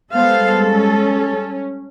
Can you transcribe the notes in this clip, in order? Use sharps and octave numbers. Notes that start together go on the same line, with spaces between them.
G3 G#3 B3 A4 C5 F5
C#4